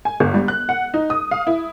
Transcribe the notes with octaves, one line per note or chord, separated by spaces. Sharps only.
G#5
G1
G3
F#6
F#5
D#4
D#6
F5
E4